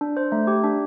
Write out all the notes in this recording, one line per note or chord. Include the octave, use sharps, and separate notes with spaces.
D4
C5
A3
G4
D4